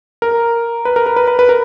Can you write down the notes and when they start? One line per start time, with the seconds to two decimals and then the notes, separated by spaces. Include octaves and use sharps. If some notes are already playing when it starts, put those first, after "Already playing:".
0.22 A#4
0.85 B4
0.96 A#4
1.06 A#4
1.16 B4
1.27 B4
1.39 B4
1.49 A#4